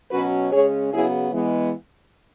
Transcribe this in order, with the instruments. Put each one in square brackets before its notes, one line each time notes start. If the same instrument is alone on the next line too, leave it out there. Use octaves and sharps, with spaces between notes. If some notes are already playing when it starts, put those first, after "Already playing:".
[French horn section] B2 F#3 C#4 F#4 B4
C#3 G#3 C#4 G#4 C#5
C#3 F#3 B3 E4 G#4
E3 G#3 B3